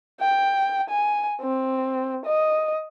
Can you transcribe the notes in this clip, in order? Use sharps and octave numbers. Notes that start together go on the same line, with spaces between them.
G5
G#5
C4
D#5